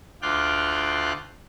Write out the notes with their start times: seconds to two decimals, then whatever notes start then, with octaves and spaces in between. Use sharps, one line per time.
0.22 D2 F4 D5 F5 G5 F#6